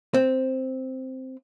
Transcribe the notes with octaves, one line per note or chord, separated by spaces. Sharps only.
C4